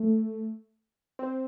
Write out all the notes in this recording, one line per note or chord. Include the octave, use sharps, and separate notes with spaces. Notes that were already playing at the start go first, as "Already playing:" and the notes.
Already playing: A3
C4